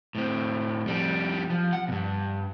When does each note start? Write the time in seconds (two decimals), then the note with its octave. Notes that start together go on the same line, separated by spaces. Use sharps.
0.15 A2 C4
0.86 F2 G3
1.50 F3
1.73 F#5
1.88 G2 B2